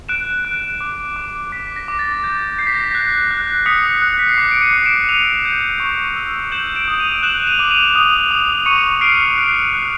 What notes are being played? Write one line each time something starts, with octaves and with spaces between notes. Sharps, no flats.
F#6 D7 E7
F#6
D6
D6
D6 B6
B6
A#6
D6
A6
G6
G6 C7
B6
A#6
B6
F#6
F#6
D#6 B6 C#7
F#6
B6
C7
D6 C#7
D7
C#7 D#7
D6
D7 E7
E6 D#7 F7
G6
C#6
E6
G6 E7 F#7
D7 E7
D#6
D#7 F7
F#6 E7 F#7
D#7 F7
D6
D#7 F7
D#6
D#6
C#6 C#7 D#7
F6 C7 D7
F#6 C7
F#6